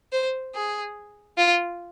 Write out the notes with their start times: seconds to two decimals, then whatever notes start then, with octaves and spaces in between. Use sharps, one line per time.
0.12 C5
0.54 G#4
1.38 F4